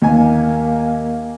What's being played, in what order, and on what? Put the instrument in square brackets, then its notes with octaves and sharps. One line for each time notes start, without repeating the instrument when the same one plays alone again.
[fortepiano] D#2 G#5 [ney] A#3